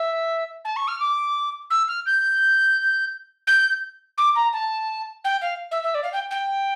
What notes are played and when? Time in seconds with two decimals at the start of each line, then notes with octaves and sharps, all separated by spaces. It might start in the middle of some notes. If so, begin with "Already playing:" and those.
Already playing: E5
0.65 A5
0.76 C#6
0.88 F6
1.00 D6
1.70 E6
1.88 F6
2.06 G6
3.47 G6
4.17 D6
4.35 A#5
4.53 A5
5.24 G5
5.41 F5
5.71 E5
5.83 E5
5.94 D5
6.03 F5
6.13 G5
6.31 G5